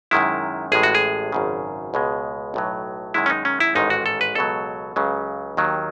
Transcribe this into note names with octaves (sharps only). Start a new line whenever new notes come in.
F#2 D#3 G#3 E4
A1 A2 G#3 G#4
F#4
G#4
G#1 F#2 C#3
C#2 B2 G#3
B1 A2 F#3
F#2 D#3 G#3 E4
C#4
D#4
C#4
E4
A1 G#2 D#3 G#3 D#4
F#4
A4
B4
C#2 B2 F#3 A4
C#2 C#3 F#3
D#2 D#3 F#3